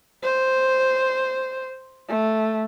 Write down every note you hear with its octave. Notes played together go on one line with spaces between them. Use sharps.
C5
A3